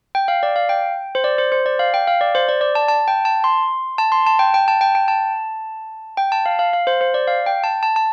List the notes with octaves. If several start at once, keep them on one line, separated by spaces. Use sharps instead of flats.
G5
F5
D5
F5
G5
C5
D5
C5
C5
D5
F5
G5
F5
D5
C5
D5
D5
A5
A5
G5
A5
C6
A5
C6
A5
G5
G5
A5
G5
G5
A5
G5
A5
F5
F5
F5
C5
C5
D5
F5
G5
A5
A5
A5